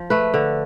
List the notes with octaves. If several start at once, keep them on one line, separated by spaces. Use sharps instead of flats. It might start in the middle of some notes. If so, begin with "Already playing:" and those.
Already playing: F3
A3 B4
D3